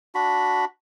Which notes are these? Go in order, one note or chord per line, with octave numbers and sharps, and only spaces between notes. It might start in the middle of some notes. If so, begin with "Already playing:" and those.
D4 F#4 B5